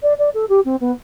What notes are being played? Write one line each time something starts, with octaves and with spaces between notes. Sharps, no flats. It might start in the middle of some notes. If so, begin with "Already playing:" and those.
D5
D5
A4
G4
C4
B3